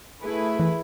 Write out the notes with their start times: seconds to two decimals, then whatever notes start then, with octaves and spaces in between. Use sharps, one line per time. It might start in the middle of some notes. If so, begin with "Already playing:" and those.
0.22 A3 E4 G#4 B4
0.60 E3